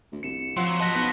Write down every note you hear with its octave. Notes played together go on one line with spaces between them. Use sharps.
D2
C2 C#7 E7
F3 F#3 C6
D#5 F#5 A5 A#6 B6
B1 F#4 B4